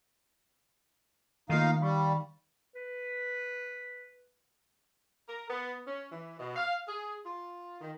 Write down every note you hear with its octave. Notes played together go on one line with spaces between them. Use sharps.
D#3 A3 A#3 D#4 F4 F5
G3 F5 B5 C#6
B4
A#4
B3
C#4
E3
B2
F5
G#4
F4
D#3